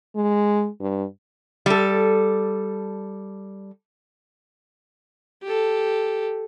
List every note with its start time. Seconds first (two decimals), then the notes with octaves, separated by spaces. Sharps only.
0.16 G#3
0.80 G2
1.66 G3 A4
5.43 G4 A4